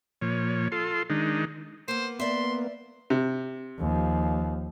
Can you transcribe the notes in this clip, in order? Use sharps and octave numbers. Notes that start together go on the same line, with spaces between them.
A#2 F3 C#5
F4 A4 C6
D#3 G#3 D4 D#4
A#3 B3 C5
A#3 B3 D5 E5 C6
C3
D#2 F3